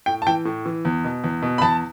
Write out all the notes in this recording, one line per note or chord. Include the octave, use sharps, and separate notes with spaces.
A2 G5
A5
E3 G5
A2
E3
E2
B2
E2
B2
B5
E2 A5